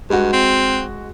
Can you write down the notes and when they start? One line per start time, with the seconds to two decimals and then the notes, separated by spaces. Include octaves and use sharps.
0.10 G2 G#3 F#4
0.33 C4